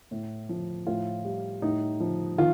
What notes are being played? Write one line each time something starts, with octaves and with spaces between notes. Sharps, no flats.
A2
F3
A2 F4
G3
A2 D#4
F3
D#3 F4